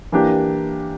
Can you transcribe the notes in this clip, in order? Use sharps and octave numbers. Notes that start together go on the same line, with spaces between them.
E3 A#3 D4 G4